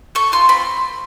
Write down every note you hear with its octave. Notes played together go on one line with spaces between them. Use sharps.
A4 C#6
F4 C6
C4 B5